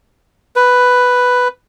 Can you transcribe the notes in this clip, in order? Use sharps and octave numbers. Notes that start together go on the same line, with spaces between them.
B4